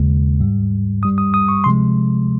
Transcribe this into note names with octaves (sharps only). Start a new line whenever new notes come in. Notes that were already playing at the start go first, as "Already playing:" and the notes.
Already playing: D#2 C#3 G#3
G#2 G3
G2 G3 D#6
D#6
D#6
C#6
C3 F3 G#3 C6